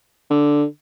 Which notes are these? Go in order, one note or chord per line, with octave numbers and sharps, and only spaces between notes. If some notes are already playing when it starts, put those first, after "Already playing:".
D3